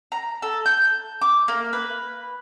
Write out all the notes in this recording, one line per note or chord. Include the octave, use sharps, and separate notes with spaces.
A#5
A4
G6
D6
A#3
B4